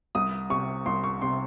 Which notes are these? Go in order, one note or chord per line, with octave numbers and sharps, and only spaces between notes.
C2 D#6
C3 C#6
C2 C6
C#6
C3 C6